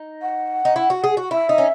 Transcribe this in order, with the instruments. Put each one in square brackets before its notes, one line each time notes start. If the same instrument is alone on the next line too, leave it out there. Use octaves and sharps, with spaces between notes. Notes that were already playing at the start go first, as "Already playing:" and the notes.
Already playing: [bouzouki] D#4
[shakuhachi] F#5
[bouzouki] D#4
E4
F#4
G#4
F#4
[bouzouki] E4 [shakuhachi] E5
[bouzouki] D#4
C#4